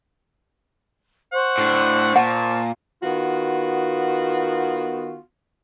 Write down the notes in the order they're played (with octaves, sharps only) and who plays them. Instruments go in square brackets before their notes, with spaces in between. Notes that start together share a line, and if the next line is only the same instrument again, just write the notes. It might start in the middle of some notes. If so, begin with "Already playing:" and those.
[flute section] C5 C#6 [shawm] F#5
[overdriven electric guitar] A2 D4
[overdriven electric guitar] A#2 [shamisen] F#5 [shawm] A5
[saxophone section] D#3 B3 F4 F#4